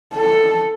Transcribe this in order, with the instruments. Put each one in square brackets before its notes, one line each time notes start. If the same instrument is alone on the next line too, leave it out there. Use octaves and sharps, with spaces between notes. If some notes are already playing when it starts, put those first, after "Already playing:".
[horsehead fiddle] A4